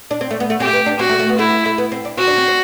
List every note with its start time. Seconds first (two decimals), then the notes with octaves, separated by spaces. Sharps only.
0.11 D4
0.21 C4
0.30 A3
0.40 B3
0.50 A3
0.60 C4 G4
0.67 A3
0.73 B3
0.86 D4
0.99 C4 F#4
1.09 A3
1.19 A3
1.29 B3
1.38 A3 E4
1.65 A3
1.78 B3
1.92 C4
2.05 D4
2.17 C4 F#4
2.27 D4
2.38 C4
2.48 C4